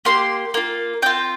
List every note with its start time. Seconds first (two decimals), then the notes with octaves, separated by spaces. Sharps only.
0.05 A#3 G4 C6
0.54 A#3 F4
1.02 C4 G5
1.06 F4